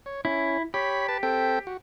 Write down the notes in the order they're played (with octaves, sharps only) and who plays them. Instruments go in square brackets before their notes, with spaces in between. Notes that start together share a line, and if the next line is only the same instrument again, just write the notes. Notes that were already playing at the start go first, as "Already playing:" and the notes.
[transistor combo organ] C#5
[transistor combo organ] C#4 [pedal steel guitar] E4
[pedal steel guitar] G4 [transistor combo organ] C#5 B5
[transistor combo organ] B4 A5
C4 A4 G5
F#4